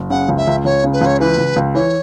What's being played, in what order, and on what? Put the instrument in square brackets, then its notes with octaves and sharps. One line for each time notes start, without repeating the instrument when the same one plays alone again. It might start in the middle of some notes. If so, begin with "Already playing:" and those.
Already playing: [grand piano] F#1
[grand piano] C#3 [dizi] F#5
[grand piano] C#2
[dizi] E5
[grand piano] C#2
[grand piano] C#2 [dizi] C#5
[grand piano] C#3
[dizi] B4
[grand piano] C#2
[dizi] C#5
[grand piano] E3 [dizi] B4
[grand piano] C#2
C#2
[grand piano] E3 [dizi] C#5